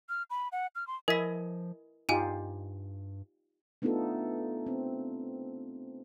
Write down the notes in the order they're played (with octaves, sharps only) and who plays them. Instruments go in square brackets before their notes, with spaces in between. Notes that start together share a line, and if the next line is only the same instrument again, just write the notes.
[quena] F6
B5
F#5
F6
C6
[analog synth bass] F3 [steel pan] E4 D#5 G#5 [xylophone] A#4 B6
[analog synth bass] G2 [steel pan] D#4 F4 G4 [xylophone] G#5 D#7
[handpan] A3 B3 D4 D#4 F4 A4
C4